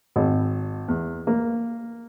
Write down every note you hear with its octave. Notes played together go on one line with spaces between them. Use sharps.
G#1
E2
A#3